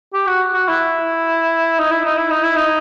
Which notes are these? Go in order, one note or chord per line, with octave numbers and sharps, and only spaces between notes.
G4
F#4
F#4
E4
D#4
E4
D#4
E4
D#4
E4
D#4